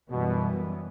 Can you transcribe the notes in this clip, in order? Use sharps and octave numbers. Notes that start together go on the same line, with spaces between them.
F#2 B2 E3 G3 B3